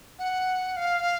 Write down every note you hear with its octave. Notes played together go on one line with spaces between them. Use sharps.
F#5
F5